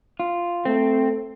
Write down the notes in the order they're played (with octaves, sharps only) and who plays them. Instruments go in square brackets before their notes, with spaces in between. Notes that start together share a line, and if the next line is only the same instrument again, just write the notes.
[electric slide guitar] F4
[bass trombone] A3 [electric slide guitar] C4